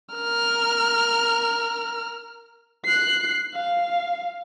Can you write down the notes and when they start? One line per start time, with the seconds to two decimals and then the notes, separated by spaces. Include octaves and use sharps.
0.15 A#4 F6
2.85 F#6 C7
3.54 F5